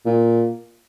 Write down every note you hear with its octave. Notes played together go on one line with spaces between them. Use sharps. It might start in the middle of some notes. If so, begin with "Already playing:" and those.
A#2